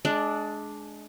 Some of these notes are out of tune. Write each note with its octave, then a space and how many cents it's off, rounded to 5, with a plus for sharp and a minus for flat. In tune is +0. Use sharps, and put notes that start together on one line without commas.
G#3 +25 D4 +0